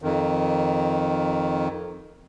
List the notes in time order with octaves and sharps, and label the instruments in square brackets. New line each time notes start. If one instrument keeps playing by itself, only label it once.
[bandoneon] F2 D#3